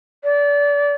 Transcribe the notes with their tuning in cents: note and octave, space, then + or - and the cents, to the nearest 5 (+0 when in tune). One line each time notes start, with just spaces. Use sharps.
D5 -30